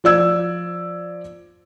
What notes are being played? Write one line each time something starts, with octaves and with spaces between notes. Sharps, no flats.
F3 D5 E6 G#6